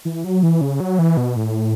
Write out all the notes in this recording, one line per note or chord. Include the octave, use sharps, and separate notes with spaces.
E3
F#3
E3
C#3
F#3
E3
B2
A2